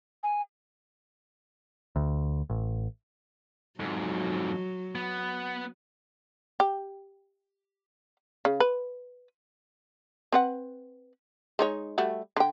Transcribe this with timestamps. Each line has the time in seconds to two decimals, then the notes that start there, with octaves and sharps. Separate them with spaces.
0.23 G#5
1.96 D2
2.50 A1
3.80 F2 G#2 F#3
4.95 B3
6.60 G4
8.45 C#3
8.60 B4
10.32 C4 B4 F#5
11.59 G#3 D#4 C#5
11.98 G3 A3 F#4
12.36 D3 G5